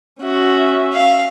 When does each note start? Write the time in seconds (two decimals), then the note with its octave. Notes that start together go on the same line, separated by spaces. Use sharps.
0.23 C#4 F#4 E5
0.93 F5